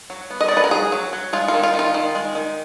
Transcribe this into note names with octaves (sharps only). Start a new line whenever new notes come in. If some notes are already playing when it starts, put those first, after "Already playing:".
F#3
B3
D#5
D5
F#3
B4
A#4
F#3 G#4
F#3
F#3
G#3 F4
F4
D#3
F4
D#3
F4
D#3
G#3
D#3